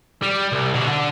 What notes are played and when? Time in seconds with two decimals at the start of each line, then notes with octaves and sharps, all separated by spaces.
0.22 G3
0.52 C2
0.74 B2 D3
0.87 D3